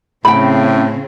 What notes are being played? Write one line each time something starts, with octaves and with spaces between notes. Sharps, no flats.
A2 C#3 C4 G5 B5